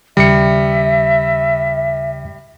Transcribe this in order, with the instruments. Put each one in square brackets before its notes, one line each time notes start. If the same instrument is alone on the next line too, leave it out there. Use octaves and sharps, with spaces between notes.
[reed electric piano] D#2 C#3 [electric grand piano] G3 C#7 [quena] E5